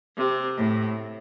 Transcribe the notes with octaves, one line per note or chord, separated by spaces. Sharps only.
C3
A2